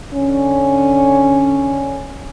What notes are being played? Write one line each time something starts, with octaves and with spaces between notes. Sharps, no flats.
D3 C#4